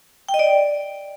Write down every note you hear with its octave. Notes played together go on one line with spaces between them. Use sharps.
G5
D#5
D5